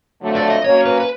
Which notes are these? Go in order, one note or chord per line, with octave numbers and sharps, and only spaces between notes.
F2 D3 F#3 A3
D5
D#5
F#3 A#3 C#4 C#5
B4
B4